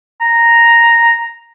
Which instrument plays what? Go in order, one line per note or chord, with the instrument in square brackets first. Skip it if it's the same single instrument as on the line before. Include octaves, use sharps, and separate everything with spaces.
[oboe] A#5